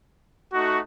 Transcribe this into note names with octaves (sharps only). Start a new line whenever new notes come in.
A3 D#4 F#4